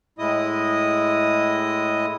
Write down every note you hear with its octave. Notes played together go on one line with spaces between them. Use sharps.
A2 G#3 E4 D#5 D#6